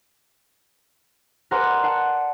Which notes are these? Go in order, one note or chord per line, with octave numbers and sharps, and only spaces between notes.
A#4 B4 D5 F#5 G#5 C6
F#5 A5 C7